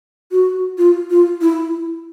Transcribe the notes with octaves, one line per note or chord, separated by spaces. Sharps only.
F#4
F4
F4
E4